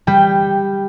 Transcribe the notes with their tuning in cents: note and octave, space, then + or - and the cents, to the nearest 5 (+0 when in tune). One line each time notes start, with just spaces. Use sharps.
G3 +10 G5 +0